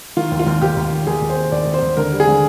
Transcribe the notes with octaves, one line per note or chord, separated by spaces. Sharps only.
D#3 F4
D#2
F4
D#2
D#2 G4
D#2
D#3
D#2 G#4
D#2
C5
A#3
D#2 D5
D#2
C5
D#2
D3 A#4
G3
G#4
D3